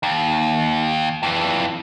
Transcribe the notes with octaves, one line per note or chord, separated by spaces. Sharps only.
D#2
F2 E3